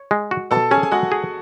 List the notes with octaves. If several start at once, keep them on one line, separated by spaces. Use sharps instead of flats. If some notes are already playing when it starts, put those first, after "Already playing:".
Already playing: C#5
G#3
F#4
B2 A4 A5
C#4 G#4 G#5
G#5
G#3 F#4 F#5
G#4